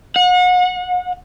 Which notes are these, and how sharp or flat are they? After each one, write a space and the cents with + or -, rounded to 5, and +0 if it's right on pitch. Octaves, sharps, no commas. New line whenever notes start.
F#5 -35